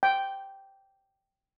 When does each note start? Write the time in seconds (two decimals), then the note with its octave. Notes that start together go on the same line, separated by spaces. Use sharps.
0.03 G5